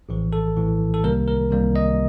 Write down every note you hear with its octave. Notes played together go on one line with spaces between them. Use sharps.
A#1 A2 E3
A4
A#1 A2 E3
A4
C2 C3 D#3 G3 A#3 A#4
A#4
C2 C3 D#3 G3 A#3
D#5